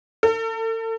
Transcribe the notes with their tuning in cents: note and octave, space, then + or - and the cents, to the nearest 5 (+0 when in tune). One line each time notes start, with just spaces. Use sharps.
A4 +40